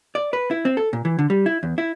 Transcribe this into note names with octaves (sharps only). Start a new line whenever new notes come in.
D5
B4
E4
C4
A4
A#2
E3
D3
G3
E4
E2
E4